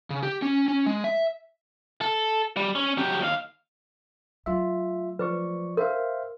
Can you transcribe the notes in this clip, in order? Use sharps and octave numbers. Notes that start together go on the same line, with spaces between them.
C#3
G4
C#4
C#4
G#3
E5
A4
G3
C#4
F#3 G4
D#2 F5
F#3 A3 F4 E5
F3 B4 D5 C#6
A#4 C5 E5 F5